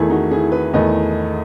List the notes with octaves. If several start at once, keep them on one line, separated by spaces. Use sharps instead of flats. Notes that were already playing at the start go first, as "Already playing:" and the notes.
Already playing: E2 D#3 A3 E4 G#4
D#4 F#4
E4 G#4
G#4 B4
E2 D#3 A3 B4 D#5